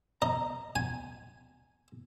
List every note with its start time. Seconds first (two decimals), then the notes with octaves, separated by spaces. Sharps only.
0.22 D#5 A#5
0.76 G#5